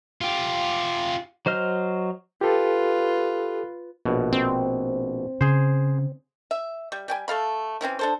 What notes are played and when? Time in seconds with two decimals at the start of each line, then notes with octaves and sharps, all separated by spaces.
0.21 F4 G4
1.46 F#3 C5 D#5 F6
2.41 F4 G4 A4 B4
4.05 A#1 B2
4.32 C4
5.41 C#3 G#4 C5
6.51 E5
6.92 G3
7.08 G3 G5 G#5
7.28 A3 A4 F5 B5
7.81 E3 C4 C#4 E4
7.99 D4 A4 C5